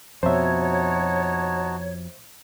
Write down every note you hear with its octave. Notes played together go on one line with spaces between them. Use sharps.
F2 B2 D#4 F#4 C5 C#5 E5 A5